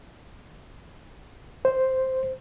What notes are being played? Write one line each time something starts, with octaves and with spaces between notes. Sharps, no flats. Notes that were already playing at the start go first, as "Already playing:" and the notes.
C5